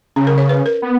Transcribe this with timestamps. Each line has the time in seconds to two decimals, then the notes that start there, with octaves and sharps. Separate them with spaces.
0.16 C#3 C#4
0.27 A#4
0.38 C#5
0.49 B4
0.66 A#4
0.82 B3